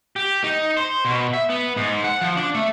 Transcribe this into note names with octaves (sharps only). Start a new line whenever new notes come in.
G4
D#4
C5
B2
E5
B3
G#2
F#5
F3
D4
A3